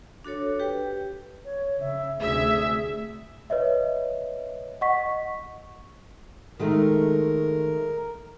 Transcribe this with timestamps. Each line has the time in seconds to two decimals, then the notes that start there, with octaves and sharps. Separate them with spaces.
0.24 D4 F#4 A4 C#5
0.59 G4 B4 G5
1.45 C#5
1.80 C#3 E5
2.21 D2 C3 A3 G#4 E5
3.50 B4 C#5 D#5 E5
4.81 D#5 F#5 C#6 B6
6.59 D#3 G#3 A3 A#4